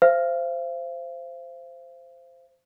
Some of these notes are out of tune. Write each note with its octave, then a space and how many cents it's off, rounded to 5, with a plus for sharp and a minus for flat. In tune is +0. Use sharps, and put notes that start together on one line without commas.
C5 -5 F5 -40